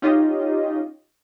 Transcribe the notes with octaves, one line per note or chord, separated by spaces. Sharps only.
C#4 D#4 F4 G4 D#5